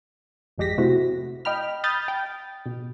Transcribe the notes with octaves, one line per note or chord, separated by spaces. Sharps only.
G#1 F2 G#3 G4 A#6 B6
C3 A3 C4 E4 F#4
D#5 G5 B5 F6
B5 D#6 F6 G6 A6
G5
B2